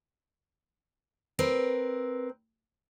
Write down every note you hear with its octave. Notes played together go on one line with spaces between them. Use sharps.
C4 A#4 B4